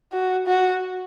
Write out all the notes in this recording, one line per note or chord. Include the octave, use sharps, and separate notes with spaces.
F#4
F#4